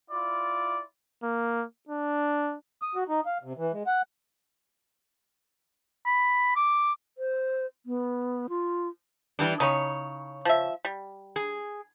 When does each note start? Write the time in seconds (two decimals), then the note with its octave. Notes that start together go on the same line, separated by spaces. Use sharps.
0.11 E4 F4 D5
1.24 A#3
1.89 D4
2.82 D#6
2.95 F#4
3.09 D#4
3.26 F5
3.43 C3
3.57 E3
3.73 G#3
3.87 F#5
6.06 B5
6.56 D6
7.18 C5
7.86 B3
8.49 F4
9.39 E3 G3 D4
9.60 C#3 C#4 D#4 C#5
10.45 F3 E5
10.85 G3
11.36 G#4